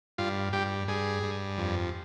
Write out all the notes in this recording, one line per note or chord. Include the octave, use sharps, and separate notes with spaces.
G2 F4
G2 G4
G2 G#4
G2
F2